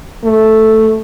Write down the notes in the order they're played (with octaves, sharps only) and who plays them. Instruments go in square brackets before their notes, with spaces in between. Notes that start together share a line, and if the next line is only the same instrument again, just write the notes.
[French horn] A3